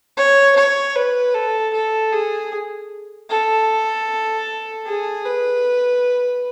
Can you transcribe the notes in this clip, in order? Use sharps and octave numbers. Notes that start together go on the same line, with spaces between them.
C#5
C#5
B4
A4
A4
G#4
A4
G#4
B4